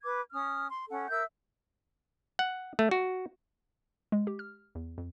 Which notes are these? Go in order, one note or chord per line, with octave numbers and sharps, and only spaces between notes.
B4 D6 G#6
C#4 D#6 F6
C6
C#4 A4 F#5
A#4 E5 E6 G6
F#5
A3
F#4
G#3
G4
F6
E2
F2